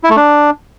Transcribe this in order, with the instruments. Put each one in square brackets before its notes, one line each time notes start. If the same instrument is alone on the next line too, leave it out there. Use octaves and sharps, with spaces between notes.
[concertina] E4
A3
D4